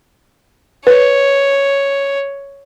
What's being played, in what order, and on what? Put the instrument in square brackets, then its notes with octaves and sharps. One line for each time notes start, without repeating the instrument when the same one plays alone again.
[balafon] B4 [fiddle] C#5